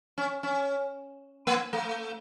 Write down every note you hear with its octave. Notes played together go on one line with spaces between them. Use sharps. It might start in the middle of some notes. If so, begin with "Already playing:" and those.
C#4
C#4
A#3
A3